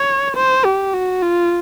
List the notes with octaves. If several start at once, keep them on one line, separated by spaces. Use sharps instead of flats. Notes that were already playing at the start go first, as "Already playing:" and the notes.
Already playing: C#5
C5
G4
F#4
F4